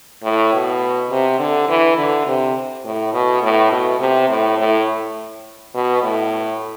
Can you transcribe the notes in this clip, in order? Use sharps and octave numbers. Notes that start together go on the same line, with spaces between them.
A2
B2
C3
D3
E3
D3
C3
A2
B2
A2
B2
C3
A2
A2
B2
A2